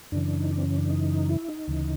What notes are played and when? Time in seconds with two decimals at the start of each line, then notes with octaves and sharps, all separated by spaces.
0.12 F#2 C#3 E3 D4
0.40 D#4
0.51 D4
0.57 C4
0.63 C#4
0.77 D4
0.90 D#4
1.29 E4
1.48 D#4
1.68 D2 C#3 E3